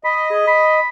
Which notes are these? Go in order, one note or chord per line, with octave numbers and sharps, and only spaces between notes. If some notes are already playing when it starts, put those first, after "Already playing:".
D#5 B5
G#4
B5